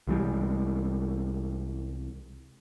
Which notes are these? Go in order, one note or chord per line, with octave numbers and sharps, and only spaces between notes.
C2 E3 G3 G#3